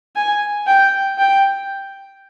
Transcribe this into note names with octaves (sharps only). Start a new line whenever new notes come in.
G#5
G5
G5